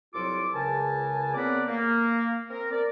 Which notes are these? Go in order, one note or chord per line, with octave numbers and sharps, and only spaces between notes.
C2 F#3 F4 A4 D6
C#2 C#3 A#4 G#5 A5
C#3 B3 C4 A#4 B4 D5
A#3
C4 A#4
A#4 D5